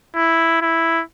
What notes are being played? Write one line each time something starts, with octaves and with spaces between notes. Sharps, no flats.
E4
E4